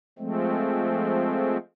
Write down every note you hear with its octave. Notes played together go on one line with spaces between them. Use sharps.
F3 G#3 A3 C4